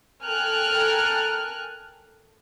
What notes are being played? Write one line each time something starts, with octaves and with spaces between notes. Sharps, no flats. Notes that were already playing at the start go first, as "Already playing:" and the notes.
A4 A#4 G5 G#5 F6 F#6